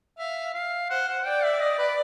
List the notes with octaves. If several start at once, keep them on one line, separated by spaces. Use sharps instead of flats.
E5 F5
F5
C5 F#5
F#5
D5 G5
E5
D#5
B4